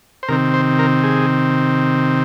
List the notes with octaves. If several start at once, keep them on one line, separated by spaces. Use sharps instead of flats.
C5
C3 D#3 C4 A#4
C5
A#4
G#4